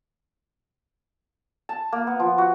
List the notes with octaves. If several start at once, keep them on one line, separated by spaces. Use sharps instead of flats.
A5
A#3
B3
F3
F#4